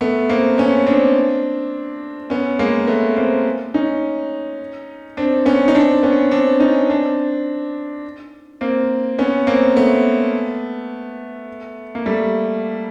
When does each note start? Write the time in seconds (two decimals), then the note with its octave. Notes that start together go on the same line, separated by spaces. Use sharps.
0.01 A3 B3
0.29 A#3 C4
0.58 B3 C#4
0.87 C4 D4
2.30 B3 C#4
2.59 G#3 A#3
2.87 A3 B3
3.16 A#3 C4
3.74 C#4 D#4
5.17 C4 D4
5.46 B3 C#4
5.68 D#4
5.75 C4 D4
6.03 B3 C#4
6.31 C4 D4
6.60 C#4 D#4
6.90 C4 D4
8.61 A#3 C4
9.19 B3 C#4
9.47 A#3 C4
9.76 A3 B3
11.95 A#3
12.06 G3 A3